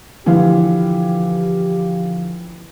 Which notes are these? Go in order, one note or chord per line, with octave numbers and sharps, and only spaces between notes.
D3 E3 F3 G4 F5